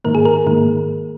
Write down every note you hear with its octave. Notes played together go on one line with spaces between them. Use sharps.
G#2 D#3 A#3 A#4
G#4
A#4
G#2 D#3 A#3